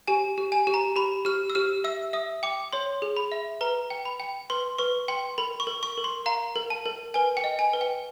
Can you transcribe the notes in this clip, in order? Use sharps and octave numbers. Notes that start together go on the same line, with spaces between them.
G4 G#5
G4
G#5
G4
A#5
G4 B5
G4 F6
E6
G4 F6
E5 E6
E5 D#6
G5 D6
C#5 C6
G#4
B5
E5
B4 A#5
G5
B5
G5
B4 C6
B4 C#6
G5 C6
A#4 B5
C#6
A#4
C#6
A#4
C6
F5 A#5
A#4
A5
A#4
B4 G#5
G5
D#5
G#5
B4
G5